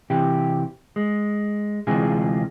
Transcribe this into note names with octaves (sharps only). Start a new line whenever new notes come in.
C3 E3 G4
G#3
D2 C3 E3 G#3 F4 G#4